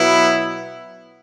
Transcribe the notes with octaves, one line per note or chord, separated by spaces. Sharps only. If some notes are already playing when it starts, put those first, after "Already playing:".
Already playing: B2 F#3 B3 E4